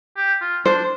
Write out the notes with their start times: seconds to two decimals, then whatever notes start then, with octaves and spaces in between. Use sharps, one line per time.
0.17 G4
0.41 F4
0.65 D4 C5